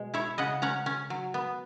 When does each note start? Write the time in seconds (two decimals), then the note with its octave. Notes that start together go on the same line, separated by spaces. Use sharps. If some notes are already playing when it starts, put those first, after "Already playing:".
Already playing: B2 G#3
0.14 E4 C#5 E5
0.38 C#3 D#5 F#5
0.62 C#4 F#5 A#5
0.86 C#4
1.10 F#3
1.34 B3